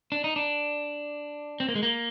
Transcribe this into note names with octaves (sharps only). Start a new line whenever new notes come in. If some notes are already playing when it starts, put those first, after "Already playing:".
D4
D#4
D4
C4
A#3
G#3
A#3